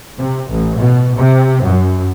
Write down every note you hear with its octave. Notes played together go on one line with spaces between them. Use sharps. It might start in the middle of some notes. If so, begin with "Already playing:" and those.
C3
A1
B2
C3
F#2